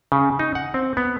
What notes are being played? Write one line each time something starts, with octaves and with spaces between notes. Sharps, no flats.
C#3
D#4
F#5
C4
B3